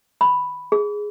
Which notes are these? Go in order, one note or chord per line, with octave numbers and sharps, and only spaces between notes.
B5
G#4